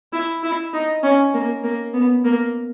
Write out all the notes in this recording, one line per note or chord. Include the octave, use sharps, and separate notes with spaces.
E4
E4
D#4
C#4
A#3
A#3
B3
A#3